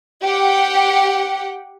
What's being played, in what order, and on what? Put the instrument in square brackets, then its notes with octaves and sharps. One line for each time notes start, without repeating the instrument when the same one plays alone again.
[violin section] G4 F#5 G5